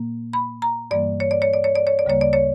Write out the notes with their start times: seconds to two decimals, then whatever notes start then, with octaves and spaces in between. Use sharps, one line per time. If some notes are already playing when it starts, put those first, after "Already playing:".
Already playing: A#2 A#3
0.33 B5
0.62 A#5
0.91 G2 E3 G3 A#3 D5
1.20 C#5
1.31 D5
1.42 C#5
1.54 D5
1.64 C#5
1.75 D5
1.87 C#5
1.99 D5
2.05 D2 C#3 G3 A#3 C#5
2.21 D5
2.33 C#5